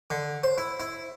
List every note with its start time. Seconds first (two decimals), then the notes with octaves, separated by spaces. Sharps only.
0.10 D3
0.43 C5
0.58 E4
0.80 E4